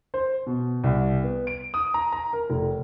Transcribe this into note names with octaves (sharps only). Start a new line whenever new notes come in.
C5
B2
C2
B3
D7
D#6
A#5
A#5
A#4
F1